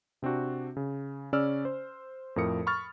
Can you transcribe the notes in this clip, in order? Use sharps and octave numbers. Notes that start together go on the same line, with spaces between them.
C3 C4 D4 F#4
C#3
C#3 C#4 D5 E6 F6
C5
F2 A2 F3 A#4 D#6 C#7
B5 C#6 F6 A6